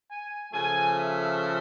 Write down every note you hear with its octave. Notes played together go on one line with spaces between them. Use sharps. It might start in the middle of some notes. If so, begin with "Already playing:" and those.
G#5
C#3 F3 A3 G#5
E5